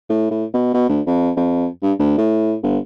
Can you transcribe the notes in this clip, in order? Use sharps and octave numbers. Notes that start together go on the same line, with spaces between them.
A2
A2
B2
B2
D2
F2
F2
G2
D2
A2
G1